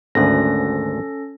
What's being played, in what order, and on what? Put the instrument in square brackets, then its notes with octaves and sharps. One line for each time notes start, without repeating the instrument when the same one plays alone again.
[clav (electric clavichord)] G#1 D2 [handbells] C#4 A4 A#6